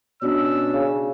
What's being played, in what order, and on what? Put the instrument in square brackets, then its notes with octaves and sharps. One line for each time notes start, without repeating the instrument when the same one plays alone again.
[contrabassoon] B2 [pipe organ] C#4 D4 [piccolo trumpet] E6
[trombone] C#3